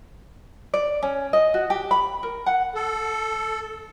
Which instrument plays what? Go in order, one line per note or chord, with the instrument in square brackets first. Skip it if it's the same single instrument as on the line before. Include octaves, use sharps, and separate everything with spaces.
[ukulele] D5
C#4
D#5
F#4
G4
B5
A#4
F#5
[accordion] A4